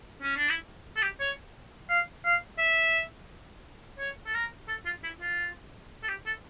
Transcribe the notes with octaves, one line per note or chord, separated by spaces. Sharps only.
C#4
D4
E4
A4
G4
C#5
F5
F5
E5
C#5
A4
A#4
A4
F4
E4
F4
A4
G4
A4